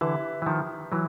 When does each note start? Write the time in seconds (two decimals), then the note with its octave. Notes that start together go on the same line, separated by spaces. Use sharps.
0.01 D3 E3 G4 B4 E5
0.42 E3
0.46 D#3 F3
0.92 E3 F#3